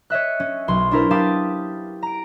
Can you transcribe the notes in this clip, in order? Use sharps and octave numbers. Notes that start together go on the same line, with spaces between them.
C#5 D#5 E5 F#6
C#4
B1 C6
D4 E4 A#4 C5
E4 G4 F5 A5 D6 D#6
A#5 D7